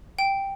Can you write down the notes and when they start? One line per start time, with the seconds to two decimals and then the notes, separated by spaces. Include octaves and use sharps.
0.19 G5